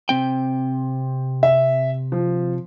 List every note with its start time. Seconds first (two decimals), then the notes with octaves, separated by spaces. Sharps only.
0.09 C3 C4 G5
1.43 E5
2.12 F3